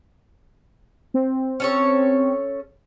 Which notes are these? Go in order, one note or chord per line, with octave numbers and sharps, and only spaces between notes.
C4
C#4 A4 C#5